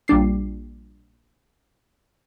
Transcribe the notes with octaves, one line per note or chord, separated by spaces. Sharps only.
A#1 G3 D4 C7